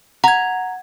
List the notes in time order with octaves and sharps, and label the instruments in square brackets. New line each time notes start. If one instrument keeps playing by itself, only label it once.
[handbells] F#5 G#6 [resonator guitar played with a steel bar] A#5